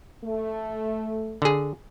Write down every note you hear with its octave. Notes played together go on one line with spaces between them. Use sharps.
A3
D3 G#4